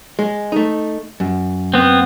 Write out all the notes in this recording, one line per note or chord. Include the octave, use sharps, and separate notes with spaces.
G#3
A3 D#4
F#2
B3 C4